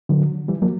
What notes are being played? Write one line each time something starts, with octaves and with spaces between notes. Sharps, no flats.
D3 F#3
E3 G3
F#3 A#3